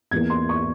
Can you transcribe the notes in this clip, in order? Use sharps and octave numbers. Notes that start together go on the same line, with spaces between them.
E2 E3 A#3 G#6
C6
C#6